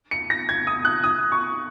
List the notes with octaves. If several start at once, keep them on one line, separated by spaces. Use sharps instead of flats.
C#7
A#6
G#6
D#6
F#6
D#6
C#6